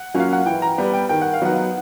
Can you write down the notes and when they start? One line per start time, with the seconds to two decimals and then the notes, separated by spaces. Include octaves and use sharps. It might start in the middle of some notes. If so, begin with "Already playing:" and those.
Already playing: F#5
0.14 F#3 A#3 C#4 F4
0.20 F5
0.33 F#5
0.46 E3 G5
0.62 A#5
0.78 G3 B3
0.93 G5
1.09 D#3 G5
1.21 F#5
1.33 F5
1.42 F#3 B3 D#4 F#5